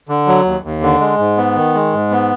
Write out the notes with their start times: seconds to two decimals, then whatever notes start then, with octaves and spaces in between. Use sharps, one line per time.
0.09 D3
0.27 F#3
0.45 D#2
0.64 D#2
0.82 D3
1.00 G#3
1.19 G#2
1.37 B3
1.56 D#3
1.74 G#3
1.93 G#2
2.11 B3